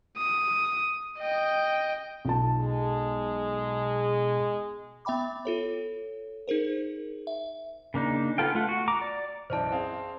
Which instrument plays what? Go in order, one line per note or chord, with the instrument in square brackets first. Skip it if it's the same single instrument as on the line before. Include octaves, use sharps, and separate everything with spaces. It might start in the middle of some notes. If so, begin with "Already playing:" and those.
[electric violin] D#6
D#5 G5
[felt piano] B1 F4 A5
[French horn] G#3
[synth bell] B3 E5 G5 B5 D6
F4 A4 C#5
D#4 G#4 A#4 C5
E5
[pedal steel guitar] C#3 A#3 D4 D#4
B3 F4 A4 F5 G5
A3 F4 F#5
F#4
A#5 D6
D5
[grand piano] B1 F#2 E3 [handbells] C5 D5 A5
[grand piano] C4 G#4 F5